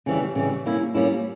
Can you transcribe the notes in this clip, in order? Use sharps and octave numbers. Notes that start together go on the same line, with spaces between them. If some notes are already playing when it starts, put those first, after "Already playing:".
C#3 E3 G3
C#3 E3 G3
G3 A#3 C#4 E4
G3 A#3 C#4 E4